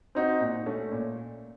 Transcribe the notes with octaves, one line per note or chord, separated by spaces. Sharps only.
C4 D#4 F#4
A#2
A3 C#4
A#2